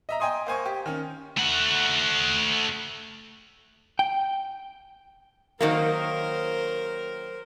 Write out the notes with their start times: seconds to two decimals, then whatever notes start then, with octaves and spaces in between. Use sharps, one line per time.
0.09 D#5 E5 A#5
0.20 D#5 G5 G#5 C6 D#6
0.47 A#3 C5 G#5 C#6
0.65 G4
0.86 D#3 C#4
1.37 A3 F#5
3.99 G5
5.61 D#3 F#3 A#3 A#4 C5